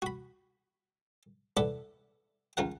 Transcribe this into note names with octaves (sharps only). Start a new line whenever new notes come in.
F#4 B5
E4 A4 B4 D5 F#5
C#2 F4 A#4 F#5